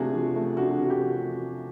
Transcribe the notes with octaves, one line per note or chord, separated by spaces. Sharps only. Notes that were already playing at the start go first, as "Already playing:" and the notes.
Already playing: C3 F3 A3 D4 F#4 G#4
F3
A3
D4 F#4
C3 F#4
G4
F3